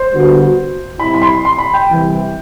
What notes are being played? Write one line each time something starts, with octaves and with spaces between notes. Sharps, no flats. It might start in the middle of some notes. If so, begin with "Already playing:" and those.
Already playing: C5
D3 G3 B3 F#4 B4
C3 G3 C4 E4 B5
B5
C6
C6
B5
G5
C2 C3 E3